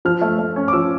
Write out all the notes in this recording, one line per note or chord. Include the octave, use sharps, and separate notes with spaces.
F3 F6
A3
A3
C#4
D6
F3 E6